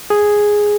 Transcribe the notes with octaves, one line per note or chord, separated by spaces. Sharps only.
G#4